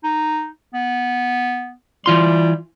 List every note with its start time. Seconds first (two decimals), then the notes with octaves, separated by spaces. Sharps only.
0.04 D#4
0.74 B3
2.06 E3 G3 F4 C6